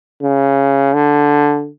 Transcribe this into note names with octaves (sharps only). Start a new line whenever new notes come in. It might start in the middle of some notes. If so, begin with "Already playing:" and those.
C#3
D3